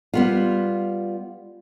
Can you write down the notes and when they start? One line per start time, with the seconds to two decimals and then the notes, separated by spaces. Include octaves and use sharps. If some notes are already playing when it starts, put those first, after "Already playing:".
0.14 G3 B3 F4